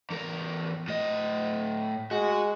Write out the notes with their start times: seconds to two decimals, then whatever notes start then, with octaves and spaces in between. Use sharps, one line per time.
0.10 E2 A#4
0.88 A2 D#5
2.11 G#3 F#4